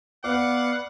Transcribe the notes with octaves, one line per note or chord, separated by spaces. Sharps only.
B3 D5 F5 F#5 D6